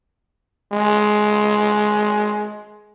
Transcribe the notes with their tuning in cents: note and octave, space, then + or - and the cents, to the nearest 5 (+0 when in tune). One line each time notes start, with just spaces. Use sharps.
G#3 +15